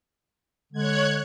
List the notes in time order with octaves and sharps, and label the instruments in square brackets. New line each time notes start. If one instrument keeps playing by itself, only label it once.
[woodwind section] D3 G#3 [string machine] C#5 F#6 G#6